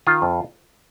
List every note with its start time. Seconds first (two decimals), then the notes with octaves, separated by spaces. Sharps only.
0.07 D#3 F4
0.22 F2